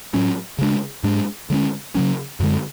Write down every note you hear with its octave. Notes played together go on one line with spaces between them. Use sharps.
A2 F#3 C#4
C#3 G#3 D4
G#2 G#3 D4
D3 G#3 C#4
C#3 F#3 C#4
F#2 D3 G#3